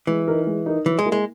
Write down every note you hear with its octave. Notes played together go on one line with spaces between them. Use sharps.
E3 G#3
D#4 A#4
G#3
D#4 A#4
E3 F#3
G#3
A#3 E4 A#4
G#3